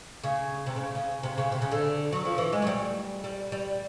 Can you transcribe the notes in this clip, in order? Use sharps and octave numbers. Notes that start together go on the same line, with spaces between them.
C#3
C3
C#3
C#3
C3
C#3
C3
C#3
D3
F#3
F3
E3
G#3
F#3
G3
G3
G3